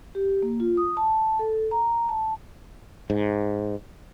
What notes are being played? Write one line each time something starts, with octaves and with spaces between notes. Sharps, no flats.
G4
A#3
F4
D#6
A5
A4
A#5
A5
G#2